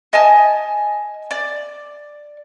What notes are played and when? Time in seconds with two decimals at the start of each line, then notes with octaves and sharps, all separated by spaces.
0.13 D#5 G#5 A5
1.31 D5